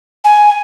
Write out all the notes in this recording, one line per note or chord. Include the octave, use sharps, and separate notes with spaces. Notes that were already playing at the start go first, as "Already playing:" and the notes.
G#5